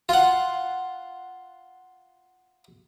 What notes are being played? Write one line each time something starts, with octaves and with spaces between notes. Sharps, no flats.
F4 F#5